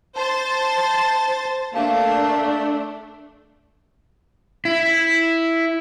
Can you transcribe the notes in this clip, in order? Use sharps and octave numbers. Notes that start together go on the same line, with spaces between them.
C5 A5 A6
A3 A#3 D4 A5
E4